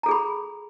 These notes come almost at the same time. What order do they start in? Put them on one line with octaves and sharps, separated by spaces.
A#5 A4 G#4 B5